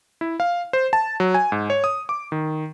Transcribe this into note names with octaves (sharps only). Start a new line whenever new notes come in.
E4
F5
C5
A5
F#3
G#5
G#2
C#5
D#6
D6
D#3